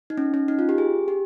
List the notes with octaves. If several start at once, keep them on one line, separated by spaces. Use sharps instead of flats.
D#4
C#4
C#4
D#4
F4
G4
G#4
G4